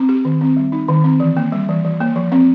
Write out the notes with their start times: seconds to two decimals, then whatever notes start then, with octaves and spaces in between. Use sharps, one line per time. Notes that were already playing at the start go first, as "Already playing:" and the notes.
Already playing: C4
0.09 G4
0.25 D#3
0.41 C4
0.57 G3
0.72 D#4
0.88 D#3
1.04 C4
1.20 E3
1.37 A#3
1.52 G3
1.69 E3
1.85 E3
2.00 A#3
2.16 F3
2.32 C4